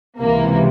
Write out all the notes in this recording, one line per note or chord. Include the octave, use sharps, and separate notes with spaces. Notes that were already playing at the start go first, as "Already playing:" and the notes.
C#2 C3 E3 A#3